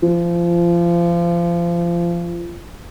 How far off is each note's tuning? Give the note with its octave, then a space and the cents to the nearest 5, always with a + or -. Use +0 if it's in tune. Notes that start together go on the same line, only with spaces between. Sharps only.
F3 -25